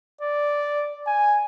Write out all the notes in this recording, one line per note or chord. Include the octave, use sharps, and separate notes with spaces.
D5
G#5